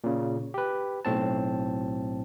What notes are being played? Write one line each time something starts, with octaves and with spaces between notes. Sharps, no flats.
A#2 C#3
G4 B4
B1 A2 C4 A5